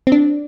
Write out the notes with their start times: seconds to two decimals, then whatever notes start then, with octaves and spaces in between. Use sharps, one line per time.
0.07 C4
0.12 D4